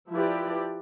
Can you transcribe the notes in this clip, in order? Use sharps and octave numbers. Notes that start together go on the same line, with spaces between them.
F3 E4 G4 B4 D5